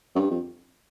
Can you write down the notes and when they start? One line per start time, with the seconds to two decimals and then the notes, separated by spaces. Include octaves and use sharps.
0.16 F#2
0.19 G2
0.30 F2